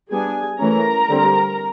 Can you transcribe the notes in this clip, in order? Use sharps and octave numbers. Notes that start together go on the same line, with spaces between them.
G3 B3 D4 G#4 G#5
E3 A3 C#4 A#4 A#5
D3 G3 C4